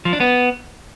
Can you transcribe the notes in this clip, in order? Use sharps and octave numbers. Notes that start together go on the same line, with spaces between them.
F3
D4
B3